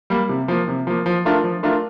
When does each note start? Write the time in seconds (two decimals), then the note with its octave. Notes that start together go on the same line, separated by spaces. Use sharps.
0.10 G3 A#3
0.29 C3
0.48 F3 A#3
0.68 C3
0.87 F3 A#3
1.06 F3
1.25 A3 D4 F4 A#4
1.44 F3
1.63 A3 D4 F4 A#4